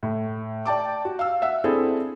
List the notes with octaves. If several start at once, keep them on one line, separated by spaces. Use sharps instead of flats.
A2
D5 G5 A5 D6
F#4
F5 E6
E5 F#5 E6
C4 D4 E4 G#4 A4